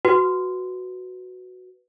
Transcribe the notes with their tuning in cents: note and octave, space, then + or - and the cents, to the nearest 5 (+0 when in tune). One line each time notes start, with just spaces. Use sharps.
F#4 +0 B4 +0